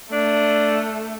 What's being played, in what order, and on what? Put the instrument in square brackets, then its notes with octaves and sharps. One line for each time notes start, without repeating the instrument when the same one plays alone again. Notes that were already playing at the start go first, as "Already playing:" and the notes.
[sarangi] A3 [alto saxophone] D4